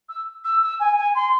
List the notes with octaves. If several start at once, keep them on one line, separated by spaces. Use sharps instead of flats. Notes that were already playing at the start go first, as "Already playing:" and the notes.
E6
E6
E6
G#5
G#5
C6